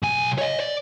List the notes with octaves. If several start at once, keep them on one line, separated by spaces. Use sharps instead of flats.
B1 G#5
C#5 D#5
D5